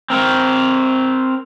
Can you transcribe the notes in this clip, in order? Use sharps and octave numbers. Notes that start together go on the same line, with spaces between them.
C4 A#4